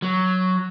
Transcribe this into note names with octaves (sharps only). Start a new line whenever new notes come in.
F#3